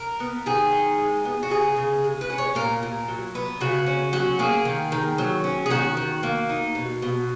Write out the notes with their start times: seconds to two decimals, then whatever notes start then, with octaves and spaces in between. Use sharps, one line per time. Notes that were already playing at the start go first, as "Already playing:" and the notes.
Already playing: A#4
0.20 B3
0.46 D#3 G#4
0.72 D#4
0.98 G#3
1.25 B3
1.43 F#4
1.50 C#3 G#4
1.77 C#3
2.04 G#3
2.21 B4
2.30 C#4
2.38 C#5
2.55 A#2 A#4
2.83 A#2
3.08 F#3
3.35 B3
3.61 C#3 F#4
3.86 C#4
4.13 F#3 F#4
4.39 A#3 G#4
4.65 D#3
4.92 D#3
5.18 F#3
5.44 C#4
5.66 G#4
5.70 D#3 F#4
5.97 D#3
6.23 A#3
6.49 D#4
6.75 B2
7.02 B2